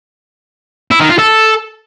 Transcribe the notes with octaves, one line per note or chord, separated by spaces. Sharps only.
E4
D#3
F4
A4